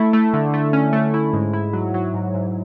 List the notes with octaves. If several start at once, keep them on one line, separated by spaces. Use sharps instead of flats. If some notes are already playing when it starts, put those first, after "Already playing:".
Already playing: A3 E4
A3
D3
A3
C#4
A3
E4
G#2
E4
F#3
F#3
G#2
G#2